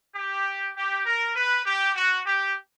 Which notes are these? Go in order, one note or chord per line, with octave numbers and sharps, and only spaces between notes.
G4
G4
A#4
B4
G4
F#4
G4